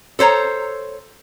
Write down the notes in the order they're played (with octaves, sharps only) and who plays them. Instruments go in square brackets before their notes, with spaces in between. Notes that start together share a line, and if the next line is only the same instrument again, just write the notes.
[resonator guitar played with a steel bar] A4 C5 C#5 A#5